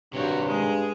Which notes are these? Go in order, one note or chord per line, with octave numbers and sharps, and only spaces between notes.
G2 C3 D#3 F#4 C#5
G#3 G#4